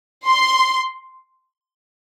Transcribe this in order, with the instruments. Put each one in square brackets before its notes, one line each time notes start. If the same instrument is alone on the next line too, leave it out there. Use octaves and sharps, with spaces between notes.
[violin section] C6